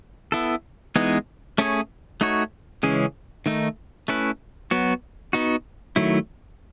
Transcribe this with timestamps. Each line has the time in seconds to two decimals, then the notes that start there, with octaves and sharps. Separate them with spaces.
0.32 B3 E4 A4
0.96 E3 G#3 B3 D#4 G#4
1.58 A3 C#4 G#4 C#5
2.21 A3 D#4 F#4 C#5
2.83 C#3 E3 G#3 C#4 G#4
3.46 D#3 A3 D#4
4.08 A3 C#4 E4 B4
4.71 F#3 B3 F#4
5.33 B3 D#4 F#4
5.96 D#3 F#3 A3 E4